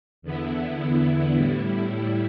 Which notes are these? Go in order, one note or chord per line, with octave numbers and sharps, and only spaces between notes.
E2 D3 B3 E4
A2 G3 E4